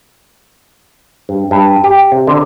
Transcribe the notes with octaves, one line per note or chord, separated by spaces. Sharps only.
G2
G2
G4
C3
D3